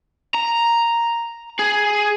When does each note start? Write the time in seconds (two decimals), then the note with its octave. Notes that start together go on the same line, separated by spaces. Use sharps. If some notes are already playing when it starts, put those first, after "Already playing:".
0.35 A#5
1.59 G#4